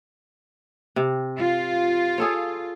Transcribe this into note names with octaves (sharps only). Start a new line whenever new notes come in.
C3
F4
G#4 A4 C#5